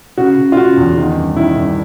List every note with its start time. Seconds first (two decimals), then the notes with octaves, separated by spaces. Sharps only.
0.18 C#3 F#4
0.37 C#3
0.52 F4
0.57 C#3 F#4
0.77 E2
0.97 D#3
1.17 G2
1.36 D#3 E4
1.56 G2